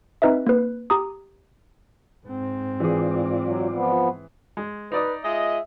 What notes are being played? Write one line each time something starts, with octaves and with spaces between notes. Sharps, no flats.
C4 D#4 B4 D#5 E5
A#3 B4
G4 A#5 D#6
G#2 C4
E3 F4 G#4 D5
F#3
F3 B3
G#3
D#4 B4 D5 D#6
G#3 F4 D#5 E5